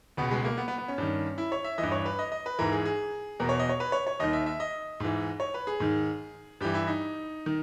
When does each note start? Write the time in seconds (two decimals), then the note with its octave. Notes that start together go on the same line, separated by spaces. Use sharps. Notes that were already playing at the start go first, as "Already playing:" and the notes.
0.17 C#2 B2 B3
0.31 G#3
0.45 A#3
0.57 B3
0.68 B3
0.78 B3
0.88 C#4
0.98 G2 D#3
1.38 E4
1.52 C#5
1.64 E5
1.78 E3 D#5
1.83 G2
1.92 C#5
2.06 B4
2.19 D#5
2.32 D#5
2.46 B4
2.59 G#2 E3 A#4
2.72 G#4
2.85 G#4
3.40 E2 B2 A#4
3.49 C#5
3.59 D#5
3.69 C#5
3.80 B4
3.92 C#5
4.07 C#5
4.20 D#2 D#3 D#5
4.33 E5
4.46 E5
4.60 D#5
5.00 G#2 E3
5.40 C#5
5.54 B4
5.67 G#4
5.80 G#2 D#3
6.61 G2 E3 G4
6.74 E4
6.87 D#4
7.46 D#3